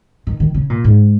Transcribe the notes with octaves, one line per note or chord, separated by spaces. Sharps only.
D#3
D#3
C#3
A#2
G#2